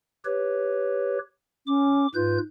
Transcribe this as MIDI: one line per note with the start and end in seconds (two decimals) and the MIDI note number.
0.25 1.18 67
0.25 1.18 71
0.25 1.18 73
1.67 2.07 61
1.67 2.08 86
2.14 2.38 44
2.14 2.40 65
2.14 2.38 71
2.14 2.38 91